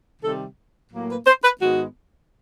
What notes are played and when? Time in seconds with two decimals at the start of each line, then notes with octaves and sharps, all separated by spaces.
0.22 C3 D#3 G3 A4
0.92 A2 F#3 A#3
1.10 B4
1.27 C5
1.44 B4
1.62 G#2 D#3 G#3 B3 F#4